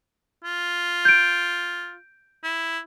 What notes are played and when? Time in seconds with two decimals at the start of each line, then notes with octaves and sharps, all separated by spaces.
0.44 F4
1.05 G6 D7
2.43 E4